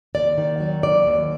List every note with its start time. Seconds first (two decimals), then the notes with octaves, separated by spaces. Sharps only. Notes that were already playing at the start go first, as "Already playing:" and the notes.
0.15 D#2 D5
0.38 D#3
0.60 F#3
0.83 D#2 D5
1.07 D#2